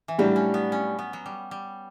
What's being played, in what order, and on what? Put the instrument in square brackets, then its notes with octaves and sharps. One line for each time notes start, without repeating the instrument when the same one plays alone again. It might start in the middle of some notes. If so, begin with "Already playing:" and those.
[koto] E3
[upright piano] A2 G3 D4 G4 [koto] F#3
[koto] C#4
B3
C#4
B3
F#3
G3
G3